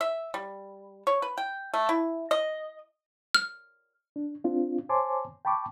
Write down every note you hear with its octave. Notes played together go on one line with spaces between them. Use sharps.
E5
G3
C#5
B4
G5
A3
E4
D#5
F6
D4
C4 D4 F4
C5 C#5 G#5 A5 C6 D6
G5 A5 B5 C#6 D6